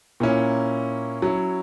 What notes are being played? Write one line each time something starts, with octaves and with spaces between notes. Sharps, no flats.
A#2 A#3 C#4 E4
F#3 C#4 E4